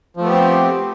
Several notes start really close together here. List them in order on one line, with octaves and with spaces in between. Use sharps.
F3 A3 B3 G4 C4